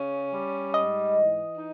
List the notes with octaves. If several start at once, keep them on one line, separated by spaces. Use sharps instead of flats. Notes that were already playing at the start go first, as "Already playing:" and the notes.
Already playing: C#3 C#4
G3
G#2 D#5
E3
D#4